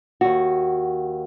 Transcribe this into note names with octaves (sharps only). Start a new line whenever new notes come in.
D#2 F#4